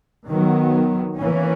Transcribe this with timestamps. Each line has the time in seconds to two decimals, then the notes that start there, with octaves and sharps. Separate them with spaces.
0.27 D#3 F#3 B3
1.17 E3 A#3 C#4